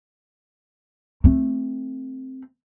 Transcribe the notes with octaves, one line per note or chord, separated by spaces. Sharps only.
A3 C4